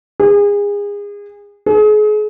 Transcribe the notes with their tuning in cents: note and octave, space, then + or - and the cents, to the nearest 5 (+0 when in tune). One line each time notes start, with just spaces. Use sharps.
G#4 -30
G#4 +35